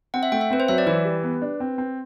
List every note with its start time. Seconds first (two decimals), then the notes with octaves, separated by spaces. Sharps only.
0.14 C4 F#5
0.23 E5
0.32 A3 G5
0.41 E5
0.51 C4 B4
0.60 C5
0.68 F#3 E5
0.78 D5
0.87 E3 B4
1.05 G3
1.23 B3
1.42 D4
1.60 C4
1.78 C4